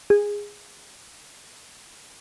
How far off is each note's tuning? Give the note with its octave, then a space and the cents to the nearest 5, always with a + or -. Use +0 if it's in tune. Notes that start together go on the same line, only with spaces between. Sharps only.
G#4 -15